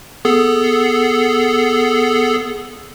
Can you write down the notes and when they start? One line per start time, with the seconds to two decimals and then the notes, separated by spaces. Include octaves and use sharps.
0.25 B3 G#4 A4